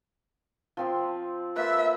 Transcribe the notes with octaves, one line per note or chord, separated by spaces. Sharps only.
F3 C4 C6
A#3 A4 B4 E5